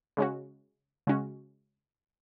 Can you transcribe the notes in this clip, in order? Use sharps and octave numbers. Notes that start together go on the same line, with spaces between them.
C#3 G#3 C#4 F#4
C#3 G#3 C#4 F#4